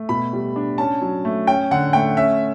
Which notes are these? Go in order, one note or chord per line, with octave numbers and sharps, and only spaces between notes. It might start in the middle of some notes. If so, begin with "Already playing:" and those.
Already playing: A3
B2 B5
G3
D4
C#4 A5
F#3
A3
C#4 G5
D3 F#5
A3 G5
C#4 E5